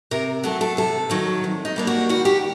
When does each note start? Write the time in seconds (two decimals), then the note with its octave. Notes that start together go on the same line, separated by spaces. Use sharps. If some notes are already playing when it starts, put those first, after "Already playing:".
0.11 C3 A#4
0.44 F#3 A3 A4
0.61 A4
0.77 C3 A4
1.10 D#3 F#3
1.44 C3
1.65 D#4
1.76 G3 A#3 D4
1.87 F#4
2.09 D#3 F#4
2.25 G4